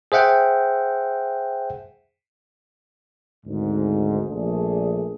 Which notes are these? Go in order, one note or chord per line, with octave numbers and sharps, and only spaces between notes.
G#4 C5 E5 F#5 G5
G#1 D2 G#2
A#1 A3 D4 G#4